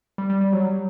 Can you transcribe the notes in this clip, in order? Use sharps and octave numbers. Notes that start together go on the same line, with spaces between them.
G3
G3
G3
F#3